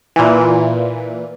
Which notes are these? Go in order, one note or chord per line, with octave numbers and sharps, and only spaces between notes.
A#2 E3